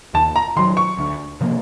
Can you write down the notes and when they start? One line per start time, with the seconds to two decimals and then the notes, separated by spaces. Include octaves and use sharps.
0.14 D#2 A5
0.36 A#5
0.56 D#3 F#3 C6
0.77 C#6
0.98 D2
1.41 C3 F3 A#3